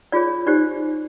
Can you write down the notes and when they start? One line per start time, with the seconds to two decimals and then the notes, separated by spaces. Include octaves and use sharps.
0.12 F4 G#4 C#5 D5
0.47 D#4 G4 C5 D5